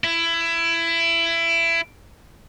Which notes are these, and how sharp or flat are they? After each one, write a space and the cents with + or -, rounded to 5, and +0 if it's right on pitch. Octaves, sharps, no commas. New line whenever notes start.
E4 +20